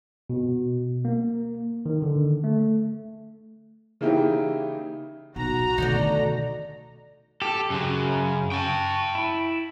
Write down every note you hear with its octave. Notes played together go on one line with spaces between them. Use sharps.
B2
A#3
D#3
D3
A3
C#3 E3 A#3 D#4 E4 G4
B1 F#4 A#5
B2 D3 D#3 A3 D#4 A4 D5
G4 A4
F#2 C#3 F#3
G5 A5 C#6
E4